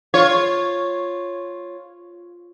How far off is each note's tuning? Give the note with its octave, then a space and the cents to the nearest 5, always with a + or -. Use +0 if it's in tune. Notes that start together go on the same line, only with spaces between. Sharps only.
F4 +0 C#5 -5